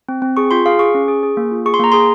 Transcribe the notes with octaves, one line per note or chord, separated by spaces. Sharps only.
C4
C4
G#4 C#6
F4 C6
G#4 F5
G#4 C#6
C#4
G#4
G#4
A#3
F4
G#4 C#6
C6
A#3 A#5
G#4 C6